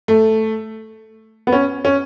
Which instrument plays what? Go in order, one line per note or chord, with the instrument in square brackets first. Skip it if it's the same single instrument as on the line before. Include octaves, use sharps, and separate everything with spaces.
[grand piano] A3
B3
C#4
C#4